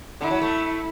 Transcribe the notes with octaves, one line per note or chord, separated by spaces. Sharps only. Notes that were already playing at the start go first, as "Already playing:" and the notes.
D3 E4
F#3
A3